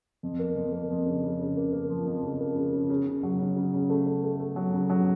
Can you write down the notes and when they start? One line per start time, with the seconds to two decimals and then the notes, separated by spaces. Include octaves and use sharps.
0.23 F2
0.39 A#3
0.56 F2
0.73 A#3
0.90 F2
1.06 C#3
1.23 C#3
1.39 C#3
1.57 A#3
1.73 A#3
1.90 F3
2.06 F2
2.23 C#3
2.40 A#3
2.56 C#3
2.73 C#3
2.89 C#3
3.06 C#3
3.23 F#3
3.39 C#3
3.57 C#3
3.73 C#3
3.90 A3
4.06 A3
4.24 A3
4.40 A3
4.56 F#3
4.74 C#3
4.90 F#3